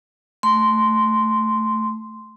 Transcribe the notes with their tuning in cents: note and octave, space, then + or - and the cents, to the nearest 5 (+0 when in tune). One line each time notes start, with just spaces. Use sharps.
A3 +0 C6 -5